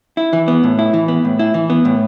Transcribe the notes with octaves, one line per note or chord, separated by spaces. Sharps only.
E4
E3
B3
A2
E4
E3
B3
A2
E4
E3
B3
A2